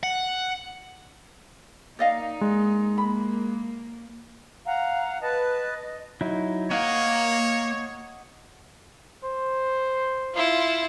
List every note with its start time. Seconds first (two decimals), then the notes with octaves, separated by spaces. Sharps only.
0.03 F#5
1.99 A#3 D#4 D5 D#5 F5
2.41 G#3
2.98 A#3 B5
4.65 F5 F#5 A#5
5.23 B4 D#5 A5
6.21 F#3 D#4 E4
6.71 A#3 C#5 D#5 F5 F#5 A#5
9.24 C5
10.34 E4 F4